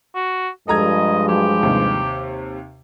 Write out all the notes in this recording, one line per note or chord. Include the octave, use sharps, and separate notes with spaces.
F#4
G2 F3 G#3 A4 D#5 A#5 G#6
F#3 G4
D#2 C3